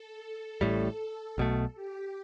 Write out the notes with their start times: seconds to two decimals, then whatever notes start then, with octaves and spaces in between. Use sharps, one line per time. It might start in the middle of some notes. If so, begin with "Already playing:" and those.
Already playing: A4
0.61 A1 A2 G3
0.99 A4
1.38 B1 B2 A3
1.75 G4